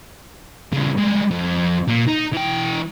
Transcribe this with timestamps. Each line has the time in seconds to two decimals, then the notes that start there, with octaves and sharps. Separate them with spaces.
0.73 C#3 G3
0.98 G3 G#3
1.31 F2
1.88 A#2
2.07 D#4
2.33 E3 G5